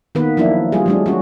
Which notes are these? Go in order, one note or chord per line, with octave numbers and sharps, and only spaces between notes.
D#3 A#3 B3 B4
F3 F#3 A#3 D4 E4
G3 F4 G#4
F#3 G#3 D4
C#4 F#4